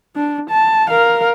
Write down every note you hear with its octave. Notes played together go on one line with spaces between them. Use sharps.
D4
A5
A#4 F5